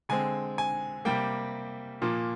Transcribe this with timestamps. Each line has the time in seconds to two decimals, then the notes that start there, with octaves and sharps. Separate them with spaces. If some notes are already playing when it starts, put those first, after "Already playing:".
0.09 D3 G#3 C4 G#5
0.58 G#5
1.05 C3 G3 A#3 G5
2.02 A#2 F3 A#3